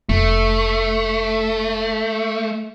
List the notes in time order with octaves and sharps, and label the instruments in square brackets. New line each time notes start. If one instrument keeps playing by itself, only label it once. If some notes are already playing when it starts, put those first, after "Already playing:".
[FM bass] F1 [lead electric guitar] A3